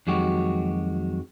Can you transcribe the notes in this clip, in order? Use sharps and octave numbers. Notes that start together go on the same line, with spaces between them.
F2 D#3 F#3 G#3 F#4 G4